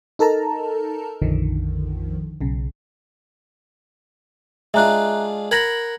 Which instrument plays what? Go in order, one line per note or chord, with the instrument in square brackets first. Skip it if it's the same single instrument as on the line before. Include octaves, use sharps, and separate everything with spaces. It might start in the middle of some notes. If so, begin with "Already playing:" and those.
[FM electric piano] D#4 A4 A#4 A5 A#5
A#1 F2 D3 D#3 F3
B1 C#3
[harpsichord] G#3 D4 F4 [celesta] E5 A#5 F#6
[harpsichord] A#4 F#5 B5 [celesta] G#6 A#6 F#7